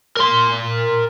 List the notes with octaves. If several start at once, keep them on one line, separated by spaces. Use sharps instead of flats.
A#4 C6